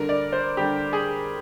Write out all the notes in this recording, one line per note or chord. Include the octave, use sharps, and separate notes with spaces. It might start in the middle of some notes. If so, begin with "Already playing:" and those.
Already playing: D3 G3 A#4
D5
C5
D3 G3 G4
G#4